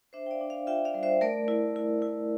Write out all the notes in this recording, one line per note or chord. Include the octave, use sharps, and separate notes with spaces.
D4 C5 E5
G5
D5 F5
D4
D5 F5
F4 E5 G5
D5 F5
G3
C5 E5
A3 A#4 D5
E4
E4
E4